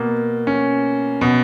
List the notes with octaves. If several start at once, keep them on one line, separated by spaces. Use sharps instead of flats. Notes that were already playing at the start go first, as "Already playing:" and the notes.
Already playing: B2 A#3
C#4
B2